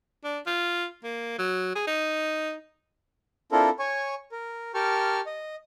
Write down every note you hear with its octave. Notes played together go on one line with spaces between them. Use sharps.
D4
F4
A#3
F#3
G#4
D#4
C4 D4 E4 F4 A4 A#4
C#5 G#5 C#6
A#4
G4 A#4 G5 A5 C#6 F6
D#5